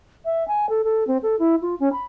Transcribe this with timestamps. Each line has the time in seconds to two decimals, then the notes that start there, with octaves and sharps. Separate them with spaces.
0.25 E5
0.48 G#5
0.69 A4
0.84 A4
1.07 C4
1.23 A4
1.39 E4
1.62 F4
1.80 C#4
1.92 B5